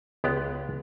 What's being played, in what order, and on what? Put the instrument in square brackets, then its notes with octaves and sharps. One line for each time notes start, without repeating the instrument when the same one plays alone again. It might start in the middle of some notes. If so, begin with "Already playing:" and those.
[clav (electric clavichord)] C#2 G#3 B3 G4 D5